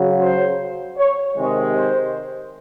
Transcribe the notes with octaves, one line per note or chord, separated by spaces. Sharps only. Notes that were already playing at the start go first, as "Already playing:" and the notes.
Already playing: C#3 F#3
C5
C#5
C3 D#3 G#3
C5